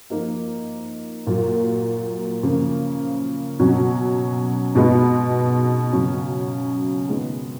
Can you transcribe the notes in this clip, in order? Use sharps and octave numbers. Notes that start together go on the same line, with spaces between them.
F3 A#3 D#4
A#2 F#3 A#3
C#3 F3 A#3
B2 F#3 C#4
B2 G#3 B3 D#4
C#3 F#3 C#4
D#3 G#3 B3